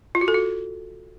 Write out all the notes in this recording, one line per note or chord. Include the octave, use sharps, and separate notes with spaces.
F4
F#4
A4
F#4